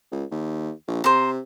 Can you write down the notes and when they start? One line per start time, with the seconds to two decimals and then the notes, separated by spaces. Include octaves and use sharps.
0.12 C#2
0.31 D#2
0.88 A#1
1.04 C3 C5 A#5